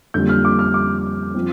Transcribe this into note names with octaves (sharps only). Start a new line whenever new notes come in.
F2 D3 G3 A#3 G6
F6
D6
F6
D6
F3 C4